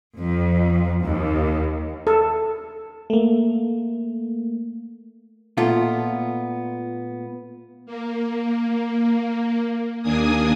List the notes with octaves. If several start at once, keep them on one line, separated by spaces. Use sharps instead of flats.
F2
D#2
A4
A3 A#3
A#2 A3 B3 F4
A#3
D#2 A#3 D4 G#5 D#6